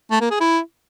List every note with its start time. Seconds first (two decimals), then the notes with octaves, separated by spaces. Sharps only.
0.11 A3
0.21 A#3
0.30 G#4
0.40 E4